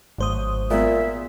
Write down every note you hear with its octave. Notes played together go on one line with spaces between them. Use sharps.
G#1 F#3 A3 F#4 C5 D#6
A#2 G#3 B3 E5